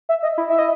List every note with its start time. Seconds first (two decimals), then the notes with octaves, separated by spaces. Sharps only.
0.09 E5
0.23 D#5
0.38 E4
0.49 E5
0.59 D#5